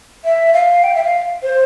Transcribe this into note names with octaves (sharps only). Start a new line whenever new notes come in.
E5
F5
G5
E5
F5
C5